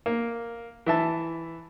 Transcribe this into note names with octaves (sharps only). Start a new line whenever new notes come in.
A#3
E3 E5 A5